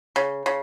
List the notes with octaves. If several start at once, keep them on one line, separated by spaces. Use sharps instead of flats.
C#3
C#3